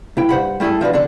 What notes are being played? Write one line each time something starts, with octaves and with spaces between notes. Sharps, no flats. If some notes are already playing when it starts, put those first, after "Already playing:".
B1 E4 G5
G2 C5 F#5 B5
G3 A3 E4 G#4 A4
F3 D4 F#4 B4
D3 D4 A4